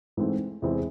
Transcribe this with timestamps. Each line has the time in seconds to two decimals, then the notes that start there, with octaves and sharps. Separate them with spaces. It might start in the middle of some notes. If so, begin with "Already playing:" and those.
0.17 G#2 E3 A3 C4
0.62 E2 C3 E3 G#3 C4